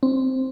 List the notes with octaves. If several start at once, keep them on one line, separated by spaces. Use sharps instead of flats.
C4